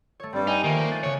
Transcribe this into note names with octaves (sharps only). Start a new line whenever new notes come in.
A3 C#5
G2 G3 C4 D5
D#4 G5 G#5
D#3 F3 A3 A#3
F#6 A6
C#3 C#5 F#6